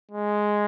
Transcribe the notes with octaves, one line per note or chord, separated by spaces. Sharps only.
G#3